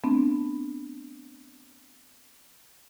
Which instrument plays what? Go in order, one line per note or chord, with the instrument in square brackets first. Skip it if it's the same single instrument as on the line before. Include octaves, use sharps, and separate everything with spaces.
[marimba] A3 B3 C4 D4